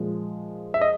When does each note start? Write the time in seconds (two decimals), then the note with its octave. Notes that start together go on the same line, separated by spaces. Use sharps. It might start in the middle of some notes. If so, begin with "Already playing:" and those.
Already playing: A#2 F3 G#3
0.74 E5
0.81 D#5